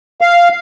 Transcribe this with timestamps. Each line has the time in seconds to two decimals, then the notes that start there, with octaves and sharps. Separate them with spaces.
0.21 F5